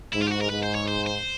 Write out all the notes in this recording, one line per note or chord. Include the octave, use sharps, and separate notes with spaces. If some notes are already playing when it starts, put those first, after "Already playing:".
G#2 E4
F4
G4
F#4
A#4
G#2 B4
C5
C#5
C5
C5